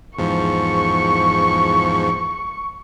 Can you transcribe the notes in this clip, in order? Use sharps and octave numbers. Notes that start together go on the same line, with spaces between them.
E2 G#2 F3 C#6